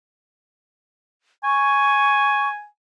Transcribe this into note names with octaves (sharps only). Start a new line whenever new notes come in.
G#5 C#6